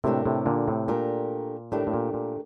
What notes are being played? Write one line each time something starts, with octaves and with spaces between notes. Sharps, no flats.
A2 C3 A3 D4 G4 A#4
A2 C3
A#2 D3
A2 C3
A#2 A3 D4 G4 A#4
A2 A3 D4 G4 A#4
A2
A#2
A#2